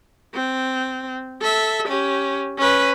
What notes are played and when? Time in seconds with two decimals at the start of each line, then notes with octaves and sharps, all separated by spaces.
0.34 C4
1.41 A4 E5
1.88 C#4 G4
2.58 C#4 B4